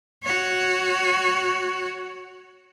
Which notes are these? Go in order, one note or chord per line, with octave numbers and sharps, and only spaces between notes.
F#4 C#5